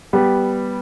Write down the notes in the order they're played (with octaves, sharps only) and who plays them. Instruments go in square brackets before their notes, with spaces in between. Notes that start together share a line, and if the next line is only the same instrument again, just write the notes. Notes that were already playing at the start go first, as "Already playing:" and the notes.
[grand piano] G3 B3 G4